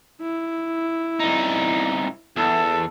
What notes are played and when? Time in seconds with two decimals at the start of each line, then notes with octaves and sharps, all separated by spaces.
0.21 E4
1.20 C2 D#4
2.36 E2 A4